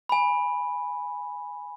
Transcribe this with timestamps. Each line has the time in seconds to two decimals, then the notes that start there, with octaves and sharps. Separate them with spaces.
0.09 G#5 B5